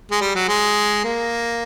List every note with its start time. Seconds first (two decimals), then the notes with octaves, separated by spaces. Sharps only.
0.11 G#3
0.21 G3
0.35 F#3
0.48 G#3
1.04 A#3